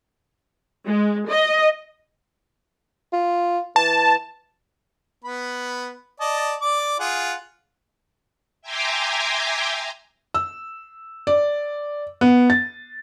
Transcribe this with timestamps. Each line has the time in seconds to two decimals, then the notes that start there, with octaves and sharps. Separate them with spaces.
0.85 G#3
1.28 D#5
3.13 F4
3.76 E3 A5
5.24 B3 B5
6.20 D5 D#5 A5
6.61 D5 D6
7.00 F4 G#4 F#5
8.61 E5 G5 G#5 A#5 C6 D6
10.34 E6
11.27 D5
12.21 B3
12.50 A6